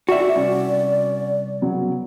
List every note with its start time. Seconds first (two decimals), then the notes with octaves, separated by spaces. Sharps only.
0.09 F#4 D5 E5
0.36 C2 C#4 F#4
1.61 C#3 F#3 B3